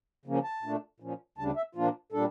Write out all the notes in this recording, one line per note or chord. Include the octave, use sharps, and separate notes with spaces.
C#3 F3 A#3 C#4
A5
A#2 A3 D4
A#2 F3 C#4
D2 C#3 G3 D4 A5
E5
A#2 F3 A#3 D4 F4
A#2 G3 D4 A4